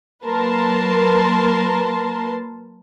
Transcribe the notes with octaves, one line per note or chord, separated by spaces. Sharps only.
F#3 A#3 A#4 B4 A5 C6